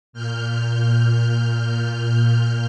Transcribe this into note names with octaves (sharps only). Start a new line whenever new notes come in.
A#2 F6 G6